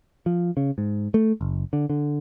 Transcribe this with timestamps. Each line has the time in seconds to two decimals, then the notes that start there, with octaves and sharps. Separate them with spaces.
0.26 F3
0.57 C#3
0.78 G#2
1.14 A3
1.41 F#1
1.73 D3
1.90 D3